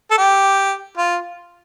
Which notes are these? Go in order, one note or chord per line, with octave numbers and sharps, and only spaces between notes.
A4
G4
F4